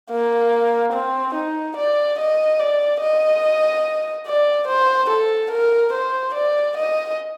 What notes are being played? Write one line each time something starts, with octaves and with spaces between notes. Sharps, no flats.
A#3
C4
D#4
D5
D#5
D5
D#5
D5
C5
A4
A#4
C5
D5
D#5